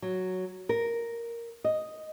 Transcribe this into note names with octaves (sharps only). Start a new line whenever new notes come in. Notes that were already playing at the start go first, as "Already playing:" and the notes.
F#3
A#4
D#5